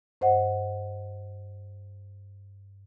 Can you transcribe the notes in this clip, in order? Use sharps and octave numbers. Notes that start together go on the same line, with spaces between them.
G2 C5 D#5 F#5